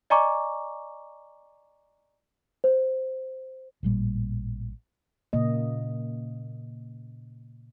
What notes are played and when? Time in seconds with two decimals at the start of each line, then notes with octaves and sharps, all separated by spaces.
0.10 D5 D#5 G#5 A#5 C#6 D6
2.64 C5
3.83 A1 A#2 G3
5.33 A#2 C#3 A#3 D#5